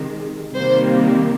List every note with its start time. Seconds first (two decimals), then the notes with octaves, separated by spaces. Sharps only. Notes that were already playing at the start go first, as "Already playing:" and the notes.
Already playing: C3 D#3 G#3
0.56 C3 D#3 G3 A#3 C5